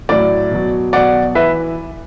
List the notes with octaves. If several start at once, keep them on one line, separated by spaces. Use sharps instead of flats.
A2 F#3 D5
B2 F#3
B2 F#3 D5 F#5
E3 B4 E5